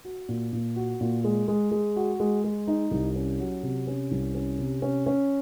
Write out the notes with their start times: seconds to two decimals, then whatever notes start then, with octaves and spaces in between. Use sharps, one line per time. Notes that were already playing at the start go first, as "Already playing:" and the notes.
0.05 F#4
0.29 A#2
0.53 A#2
0.76 F#4
1.01 A#2
1.24 G#3
1.48 G#3
1.71 G#3
1.96 F#4
2.20 G#3
2.44 G#3
2.68 D#4
2.91 C2
3.16 C#4
3.40 F#3
3.63 C3
3.87 C#4
4.11 C2
4.35 C#4
4.59 C3
4.82 C#4
5.06 C#4